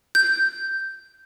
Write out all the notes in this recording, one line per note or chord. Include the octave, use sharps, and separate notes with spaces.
G6